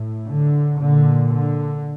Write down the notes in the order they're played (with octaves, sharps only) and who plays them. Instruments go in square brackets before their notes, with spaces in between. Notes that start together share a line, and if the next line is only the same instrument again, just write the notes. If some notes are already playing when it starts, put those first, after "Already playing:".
Already playing: [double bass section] A2
D3
A#2 D3
D3